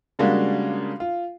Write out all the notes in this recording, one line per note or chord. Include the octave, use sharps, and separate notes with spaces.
C#3 G3 G#3 A#3 D4 F#4
F4